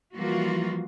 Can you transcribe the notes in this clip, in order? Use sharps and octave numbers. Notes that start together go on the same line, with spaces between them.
E3 F3 G3 A#3 F4 F#4